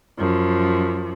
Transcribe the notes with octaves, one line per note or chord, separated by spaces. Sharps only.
F#2 F3